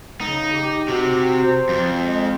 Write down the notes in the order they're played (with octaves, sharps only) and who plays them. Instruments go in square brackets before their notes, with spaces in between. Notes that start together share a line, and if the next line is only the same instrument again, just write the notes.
[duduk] C#3 [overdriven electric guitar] D#4
[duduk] G4
[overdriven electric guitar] C3 [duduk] F#4
[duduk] C5
[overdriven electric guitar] F2
[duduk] G#3